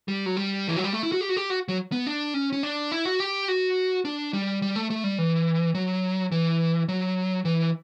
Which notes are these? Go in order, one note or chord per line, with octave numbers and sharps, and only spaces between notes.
G3
F#3
G3
E3
F#3
G3
A3
E4
F#4
G4
F#4
G4
F#4
F#3
B3
D4
C#4
C#4
D4
E4
F#4
G4
F#4
D4
G3
G3
A3
A3
G3
E3
F#3
E3
F#3
E3